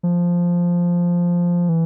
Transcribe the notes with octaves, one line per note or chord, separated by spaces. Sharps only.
F3
E3